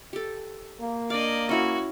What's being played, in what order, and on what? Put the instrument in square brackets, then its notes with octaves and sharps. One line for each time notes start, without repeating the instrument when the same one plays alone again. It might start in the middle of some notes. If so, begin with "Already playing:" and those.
[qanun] G4 A4
[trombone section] A#3
[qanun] D4 F5 [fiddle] D5 D#5
[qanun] C#4 E4 C#5 [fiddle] F#4